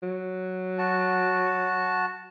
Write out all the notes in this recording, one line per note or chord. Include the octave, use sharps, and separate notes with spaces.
F#3
F#4 A5